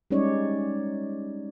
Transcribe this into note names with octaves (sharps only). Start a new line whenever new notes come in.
G3 G#3 C#4 D#4 C#5 D5